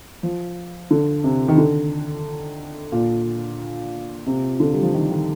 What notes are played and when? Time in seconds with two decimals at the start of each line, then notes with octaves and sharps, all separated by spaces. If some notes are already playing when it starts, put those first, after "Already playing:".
0.23 F3
0.91 D3
1.24 C3
1.48 D#3
1.58 D3
2.92 A#2
4.26 C3
4.60 D3
4.73 G3
4.83 F3
4.94 D#3
5.11 D#3